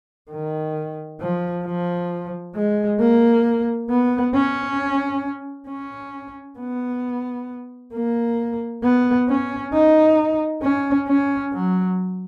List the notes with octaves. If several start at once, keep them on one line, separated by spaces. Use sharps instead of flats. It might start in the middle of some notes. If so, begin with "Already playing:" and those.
D#3
F3
F3
G#3
A#3
B3
C#4
C#4
B3
A#3
B3
C#4
D#4
C#4
C#4
F#3